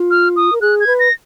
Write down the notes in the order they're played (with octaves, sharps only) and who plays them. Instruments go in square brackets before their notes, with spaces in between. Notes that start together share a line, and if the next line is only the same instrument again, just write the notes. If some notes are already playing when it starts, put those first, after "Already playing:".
Already playing: [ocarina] F4
[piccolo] F6
D#6
[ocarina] A#4
[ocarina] G#4 [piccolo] F#6
[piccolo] G#6
[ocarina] B4
[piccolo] A#6